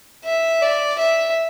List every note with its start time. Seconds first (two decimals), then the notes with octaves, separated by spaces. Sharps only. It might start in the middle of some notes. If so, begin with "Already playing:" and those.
0.25 E5
0.62 D5
0.99 E5